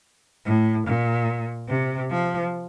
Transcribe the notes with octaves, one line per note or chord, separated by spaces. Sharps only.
A2
A#2
C3
F3